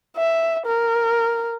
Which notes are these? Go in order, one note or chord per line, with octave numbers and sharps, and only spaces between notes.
E5
A#4